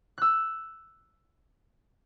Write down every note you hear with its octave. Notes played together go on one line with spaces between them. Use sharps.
E6 F#6